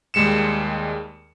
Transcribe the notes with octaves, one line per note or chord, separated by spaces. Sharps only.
D#2 G3 G#3 C#7 E7